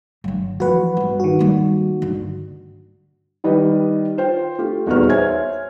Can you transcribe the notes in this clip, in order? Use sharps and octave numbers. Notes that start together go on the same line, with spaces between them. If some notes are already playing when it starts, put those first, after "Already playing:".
G1 D3 F#3
E3 F3 F#4 B4 F#5
G1 G3
D#3 F#4
G3 A#3
G2 D3
D#3 G3 B4 D#5
F4 C5 G5
A3 F4 G4
D#1 E2 D#4 F#4 B4 F6
C5 C#5 E5 G#5 F6 G#6